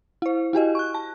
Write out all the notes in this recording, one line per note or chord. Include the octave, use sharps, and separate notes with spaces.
E4 C5
E4 F#4 G4 D#5
C#6 F#6
A5